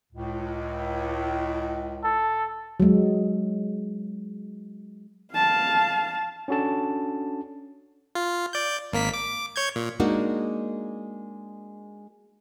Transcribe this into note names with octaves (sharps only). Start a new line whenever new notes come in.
C#2 A2
A4
F#3 G#3
F5 A5
C#4 D4 F#4 A4 A5
F4
D5 G6
G#1 A#3 B6
D6
C#5 G6 G#6
A#2
G#3 A#3 D4 D#4 F#4